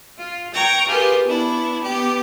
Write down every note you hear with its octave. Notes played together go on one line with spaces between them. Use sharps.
F4
G5 A#5 C#6 G#6
F4 G4 G#4 A#4 B4 G5
B3 D4 E4
B3 G4